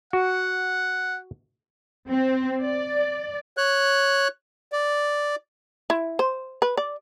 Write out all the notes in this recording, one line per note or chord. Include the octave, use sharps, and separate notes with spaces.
F#4 F#5
C4
D5
C#5 F#6
D5
E4
C5
B4
D5